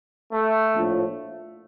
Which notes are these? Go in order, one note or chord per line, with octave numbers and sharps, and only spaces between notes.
A3
A#1 A2 F3